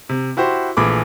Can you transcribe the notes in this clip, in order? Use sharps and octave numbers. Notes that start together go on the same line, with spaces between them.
C3
E4 F#4 G4 C5
A#1 E3 A3 G#4 B5 D6